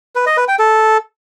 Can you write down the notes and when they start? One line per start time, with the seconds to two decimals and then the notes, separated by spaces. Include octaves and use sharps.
0.15 B4
0.26 D#5
0.37 B4
0.48 G5
0.59 A4